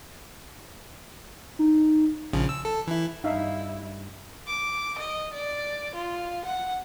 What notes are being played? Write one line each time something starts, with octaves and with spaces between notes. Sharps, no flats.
D#4
A#1 C#3 F3
E6
A4
E3 E4
G2 D#4 E4 E5 F5
D6
D#5
D5
F4
F#5